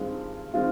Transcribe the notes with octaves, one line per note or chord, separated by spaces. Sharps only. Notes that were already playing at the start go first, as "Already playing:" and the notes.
Already playing: G2 D#3 G#3 C4 F4
D#3 G#3 C4 F4